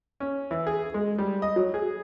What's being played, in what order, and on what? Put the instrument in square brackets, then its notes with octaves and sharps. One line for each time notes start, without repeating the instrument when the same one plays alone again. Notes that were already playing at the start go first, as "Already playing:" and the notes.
[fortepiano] C#4
E3
G#4
G#3
G3
D#5
F#3
G#4